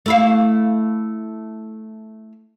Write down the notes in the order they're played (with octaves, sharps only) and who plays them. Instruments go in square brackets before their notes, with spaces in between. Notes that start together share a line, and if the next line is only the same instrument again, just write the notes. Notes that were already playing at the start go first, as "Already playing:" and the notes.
[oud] A3 E4 F5